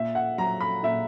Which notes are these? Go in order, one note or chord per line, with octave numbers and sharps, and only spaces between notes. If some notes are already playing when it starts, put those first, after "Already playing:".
Already playing: A#2 E5
F#5
F#3 A#5
B5
A#2 E5